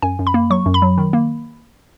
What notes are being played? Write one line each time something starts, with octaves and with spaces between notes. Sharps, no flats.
F#2 G#5
F#2
B5
A#3
F#3 C#6
F#2
B5
F#3
D#3
A#3